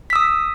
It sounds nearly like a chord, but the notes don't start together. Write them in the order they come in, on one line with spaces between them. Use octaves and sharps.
B6 E6 D#6